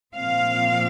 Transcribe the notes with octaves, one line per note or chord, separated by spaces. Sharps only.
A#2 F3 C4 F5